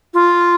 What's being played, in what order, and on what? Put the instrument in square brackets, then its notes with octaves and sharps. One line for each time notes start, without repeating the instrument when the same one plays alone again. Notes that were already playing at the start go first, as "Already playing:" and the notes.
[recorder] F4